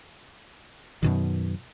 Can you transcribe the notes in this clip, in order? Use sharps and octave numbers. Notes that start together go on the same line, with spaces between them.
F#2 B2 D#3